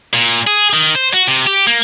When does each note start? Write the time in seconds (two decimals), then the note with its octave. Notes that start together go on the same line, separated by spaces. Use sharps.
0.13 A#2
0.47 G#4
0.73 D#3
0.95 C5
1.13 F#4
1.28 C3
1.47 G4
1.67 A#3